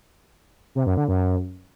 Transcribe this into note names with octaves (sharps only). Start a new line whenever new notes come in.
C3
F#2
D3
F#2